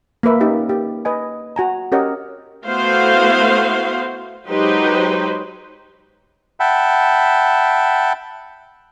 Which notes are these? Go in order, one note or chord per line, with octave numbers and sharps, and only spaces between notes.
A#3 A#4 B4 E5
C#4 D#4 G4 E5
G4
B4 D#5 G#5
F#4 G#5 A#5
C#4 G4 A#4 C#5 D#5 F#5
A3 B3 E4 F#4 C5 F5
F#3 G#3 D#4 G4 B4 C5
E5 F#5 G5 A5 B5